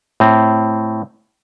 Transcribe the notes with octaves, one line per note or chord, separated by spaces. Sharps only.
A2 C4